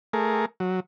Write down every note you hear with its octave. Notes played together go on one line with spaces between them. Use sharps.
A3 G#4 A#4
F#3